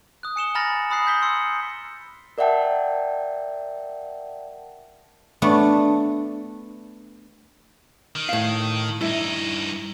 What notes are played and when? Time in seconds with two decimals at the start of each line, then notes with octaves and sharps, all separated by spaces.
0.23 D#6 F#6
0.36 G#5 C#7 E7 G7
0.55 G#5 A#5 B5 F6 A6 A#6
0.90 B5 D#6 F#6 C7
1.06 D#6 G6 B6 G7
1.22 C6 E6 C#7
2.38 A#4 D5 E5 F#5 G5 A5
5.42 A3 B3 D4
8.16 D#3
8.29 A2 F5
9.01 G2 D#4 E4